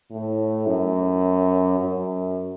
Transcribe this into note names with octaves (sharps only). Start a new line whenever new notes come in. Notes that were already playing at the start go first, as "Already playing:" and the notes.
A2
F#2
F#2